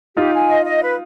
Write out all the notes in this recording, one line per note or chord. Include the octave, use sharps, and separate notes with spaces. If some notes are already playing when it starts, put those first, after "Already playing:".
D#4 F4 G4
G#5
D#5
D#5
B4